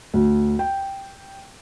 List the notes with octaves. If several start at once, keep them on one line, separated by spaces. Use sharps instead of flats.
D2
G5